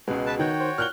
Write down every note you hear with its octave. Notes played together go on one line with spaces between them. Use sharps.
C#2 B2 G#3
B4 A5
D#3 F#4 C#5 G5
C5
A#2 F6 F#6 G7